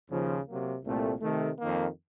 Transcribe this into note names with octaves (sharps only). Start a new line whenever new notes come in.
D#2 C#3 F3
C3 F#3 A#3
C2 A#2 A3 C4
C3 D#3 A3
F2 D#3 A#3